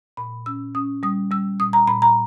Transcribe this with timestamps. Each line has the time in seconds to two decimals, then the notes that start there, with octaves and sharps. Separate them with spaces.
0.17 A#2 B5
0.46 C#4 E6
0.75 C#4 D#6
1.03 G3 D#6
1.31 G3 E6
1.59 A#2 D#6
1.73 A#5
1.88 A#2 B5
2.02 A#5